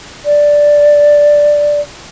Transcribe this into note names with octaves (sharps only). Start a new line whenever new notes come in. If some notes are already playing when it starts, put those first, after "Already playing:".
D5